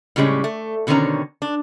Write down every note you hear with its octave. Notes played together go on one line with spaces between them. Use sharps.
A2 C#3 G3 G#3 C#4
A3
B2 D3 D#3 C4 C#4 A#5
D4